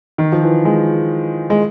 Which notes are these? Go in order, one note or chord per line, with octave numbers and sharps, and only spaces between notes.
D#3
F3
E3
G#3
G#3